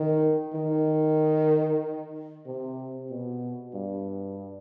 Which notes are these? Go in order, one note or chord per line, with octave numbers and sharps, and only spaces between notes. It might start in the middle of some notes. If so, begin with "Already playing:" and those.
Already playing: D#3
D#3
C3
B2
G2